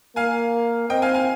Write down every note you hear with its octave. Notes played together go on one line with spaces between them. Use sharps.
A#3 F5 G#5
C4 D#5 G5
F5 G#5
F5 G#5